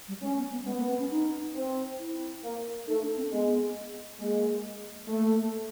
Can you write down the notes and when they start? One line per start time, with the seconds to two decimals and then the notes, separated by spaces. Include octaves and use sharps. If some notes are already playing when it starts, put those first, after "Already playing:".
0.08 G3
0.22 G#3 C#4
0.37 B3
0.52 B3
0.66 G#3 B3
0.78 A#3
0.89 C4
1.00 C#4
1.11 D#4
1.55 C4
1.99 E4
2.44 A#3
2.87 A3 D#4
3.02 D4
3.17 C4
3.32 G#3 B3
4.20 G#3 A#3
5.08 A3 A#3